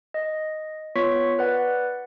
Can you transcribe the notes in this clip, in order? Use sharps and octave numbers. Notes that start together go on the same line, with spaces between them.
D#5
B3 F4 C#5 C#6 B6
B4 D5 F#5